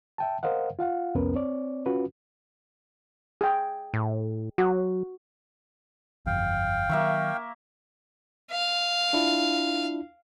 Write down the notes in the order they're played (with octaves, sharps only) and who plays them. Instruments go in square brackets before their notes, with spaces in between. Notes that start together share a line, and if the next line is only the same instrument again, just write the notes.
[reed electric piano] E5 G5 A5
A#4 C5 D#5 F5 F#5
F4 F5 F#5
C2 F2 B3 C#4 A#4 B4
C4 C#5 D5
C#4 F4 F#4 B4
[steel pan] G#4 G5
[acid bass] A2
[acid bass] F#3 [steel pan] F#4
[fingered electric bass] G1 F2 [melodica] F5 G5
[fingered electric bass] D#3 F#3 [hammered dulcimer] A#3 E5 C#6
[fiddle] F5
[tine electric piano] D4 E4 F4